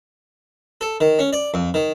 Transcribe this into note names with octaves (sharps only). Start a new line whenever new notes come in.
A4
D#3
C#4
D5
F2
D#3